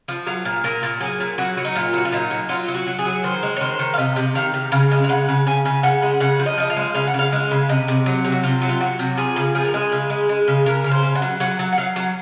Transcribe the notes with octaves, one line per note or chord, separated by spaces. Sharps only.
F3
F#3 F5
A#2
A#2 A#4
A#2
F#3 G#4
A#2
F#3 F#4
F#3
D#4
A#2 F4
F#3 F#4
F4
A#2 D#4
F#3
F#3 F4
F#3
F#4
F#3
G#4
F#3
D#3 C5
G#3
C#5
D#3 C5
D#3
F5
C3 D#5
C3
D#3 F5
C3
C#3 F5
G#3
F5
C#3 F#5
C#3
C#3 G#5
C#3
C#3 F#5
G#3
C#3 F#5
F3
D#5
F3 D#5
F5
G#3
C#3 F5
F#5
C#3 F5
G#3
C#3
C3 D#5
C3
F#3
C3
F#4
C3 F4
F#3
F4
F#3 F#4
C3
F3 G#4
C#3
F3 G#4
A#4
G#3 G#4
C#3
G#3
G#3
C#3
C#3 A#4
C#3 A#4
C5
C#3
F#5
F#3
F#3 F#5
F#3
F#5
F#3 F5
F#3